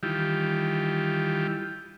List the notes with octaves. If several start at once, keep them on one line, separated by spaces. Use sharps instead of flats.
D#3 E3 G3 F4 G4